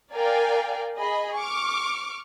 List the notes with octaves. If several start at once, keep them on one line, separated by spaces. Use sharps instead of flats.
A#4 D5 F5 G5 G#5
G#4 D#5 B5
C#6 D6 F6